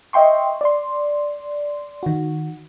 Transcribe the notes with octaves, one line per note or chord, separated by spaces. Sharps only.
D#5 E5 G5 C6 C#6
D5 C6
D#3 F#4